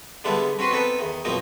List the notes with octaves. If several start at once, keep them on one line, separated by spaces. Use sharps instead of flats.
D3 G3 G#3 B3 D4 E4
C4 C#4 F#4 B4 C6
B3 C4 D#4 A4 B4
E2 D#3
F#2 B2 F3 A#3 C4 D#4